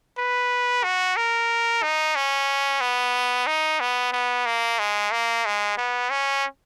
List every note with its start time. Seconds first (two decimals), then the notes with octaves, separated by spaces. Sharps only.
0.18 B4
0.84 F#4
1.16 A#4
1.82 D#4
2.15 C#4
2.81 B3
3.47 D#4
3.80 B3
4.13 B3
4.46 A#3
4.79 G#3
5.11 A#3
5.45 G#3
5.77 B3
6.10 C#4